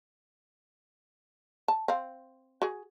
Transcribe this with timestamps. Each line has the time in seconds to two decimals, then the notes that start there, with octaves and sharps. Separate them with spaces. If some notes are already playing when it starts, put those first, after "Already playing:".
1.68 A5
1.88 C4 F5
2.62 F#4 G#4